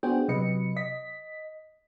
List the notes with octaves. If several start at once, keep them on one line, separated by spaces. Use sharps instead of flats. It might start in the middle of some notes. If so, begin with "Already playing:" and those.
B3 D4 F#4 G#4 C5 G5
C3 F#3 B4 D#5 C#7
D#5 B6